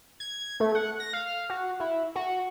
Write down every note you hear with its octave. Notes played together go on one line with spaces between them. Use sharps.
G#6
A3
F#5
A#6
F5
F#4
E4
F#4